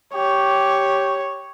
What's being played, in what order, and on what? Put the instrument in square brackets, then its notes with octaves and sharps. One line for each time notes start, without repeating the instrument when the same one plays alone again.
[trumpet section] G4 [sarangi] C#5